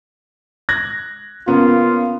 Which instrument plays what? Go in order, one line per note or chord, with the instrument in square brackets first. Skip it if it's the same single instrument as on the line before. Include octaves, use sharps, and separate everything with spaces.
[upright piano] F#6 G#6 A#6
[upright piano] C#3 A#3 B3 [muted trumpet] F4